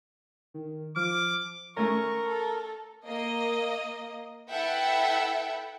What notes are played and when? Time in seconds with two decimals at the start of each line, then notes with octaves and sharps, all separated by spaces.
0.54 D#3
0.96 F3 D6 F6
1.77 A3 C#4 A#4 C#6
2.28 A4
3.06 A#3 D#5
4.49 E4 A4 B4 E5 F#5 G5